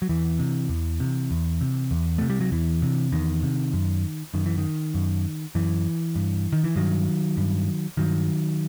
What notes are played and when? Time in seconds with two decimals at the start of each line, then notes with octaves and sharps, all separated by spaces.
0.02 F#3
0.09 E2 E3
0.39 C3
0.69 E2
1.00 C3
1.31 E2
1.61 C3
1.91 E2
2.18 C3 A3
2.30 G3
2.41 F#3
2.52 E2 E3
2.82 C3
3.12 E2 D#3
3.43 C3
3.73 F#2
4.34 F#2 D#3
4.46 E3
4.58 D#3
4.94 F#2
5.55 F#2 E3
6.16 G2
6.53 D#3
6.64 E3
6.76 G2 D#3 F#3
7.37 G2
7.97 G2 D#3 F#3